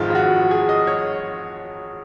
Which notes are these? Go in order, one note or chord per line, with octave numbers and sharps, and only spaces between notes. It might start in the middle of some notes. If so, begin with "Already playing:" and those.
Already playing: G#1 G#2 F3 F4
F4
F#4
G#4
D#5
C#5